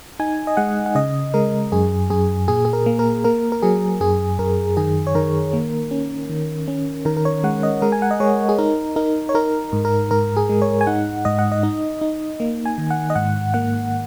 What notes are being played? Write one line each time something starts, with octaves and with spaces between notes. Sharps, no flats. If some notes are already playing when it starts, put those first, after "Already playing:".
D#4 G#5
D#5
G#3 F#5
F#5
C#3 D#5
G#3 A#4
F#2 G#4
F#2 G#4
A#2 G#4
G#4
A#4
A#3
A#4
A#3 A#4
A#4
F#3 G#4
F#2 G#4
F#2 A#4
D#3 G#4
C#5
D#3 A#4
A#3
C#4
D#3
C#4
D#3 A#4
A#4
C#5
G#3 F#5
D#5
G#3 A#4
G#5
F#5
D#5
G#3 C#5
G#4
D#4 A#4
D#4 A#4
C#5
D#4 A#4
G#2
A#4
G#2 A#4
G#4
G#3
C#5
G#5
D#4 F#5
G#2 D#5
F#5
D#5
D#4
D#4
A#3
G#5
D#3
F#5
D#5
G#2 F#5
A#3 F#5